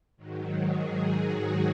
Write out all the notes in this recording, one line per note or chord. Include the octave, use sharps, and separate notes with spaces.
G#2 D#3 F#3
G#4
F#4